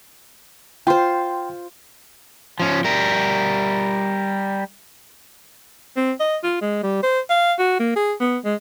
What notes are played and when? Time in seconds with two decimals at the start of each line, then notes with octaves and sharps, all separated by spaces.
0.87 F4 C5 G5 C6
2.60 F3 C#4
2.84 G3 A#4
5.97 C4
6.20 D#5
6.44 F4
6.61 G#3
6.83 G3
7.03 C5
7.30 F5
7.59 F#4
7.80 A#3
7.96 G#4
8.21 B3
8.45 G#3